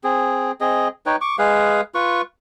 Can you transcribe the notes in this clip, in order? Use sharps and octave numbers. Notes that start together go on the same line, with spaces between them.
C4 G#4
C4 G#4 D#5
D#4 B4 C#5 G5
C#6 D6
G#3 G#4 B4 F5
F4 B4 C#6